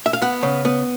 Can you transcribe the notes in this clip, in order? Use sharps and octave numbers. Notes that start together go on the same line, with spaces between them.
E5
F5
B3 F#5
C#3
B3